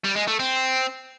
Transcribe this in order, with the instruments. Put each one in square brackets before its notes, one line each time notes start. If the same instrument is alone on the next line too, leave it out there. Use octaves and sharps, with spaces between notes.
[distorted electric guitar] G3
G#3
A3
C4